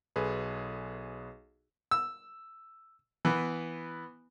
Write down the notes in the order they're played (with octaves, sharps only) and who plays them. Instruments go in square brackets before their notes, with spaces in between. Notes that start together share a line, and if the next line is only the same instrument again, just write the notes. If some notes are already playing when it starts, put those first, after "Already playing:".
[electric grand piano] B1 G#4 A4 B4
[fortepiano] E6
E3 B3